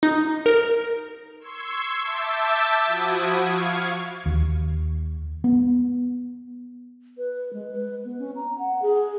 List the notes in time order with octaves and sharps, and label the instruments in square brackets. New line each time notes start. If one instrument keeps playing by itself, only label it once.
[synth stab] D#4
A#4
[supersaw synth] C6 C#6 E6 G#6
E5 A5 D6 E6 G6 A6
F3 F#4 B5 D#6 G#6 D7
F5 C#6 G#6
[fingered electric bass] D#2
B3
[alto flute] B4
G#3
B4
B3
C#4
A#5
F#5
G#4